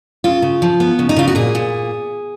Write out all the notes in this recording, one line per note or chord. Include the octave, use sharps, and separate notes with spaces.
C#3 F4
C#3
F3
B3
C#3
D#4
C#3 F4
F#4
A#2 G#4
A#2